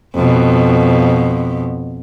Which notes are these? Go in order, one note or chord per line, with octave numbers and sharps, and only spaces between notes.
F2 B2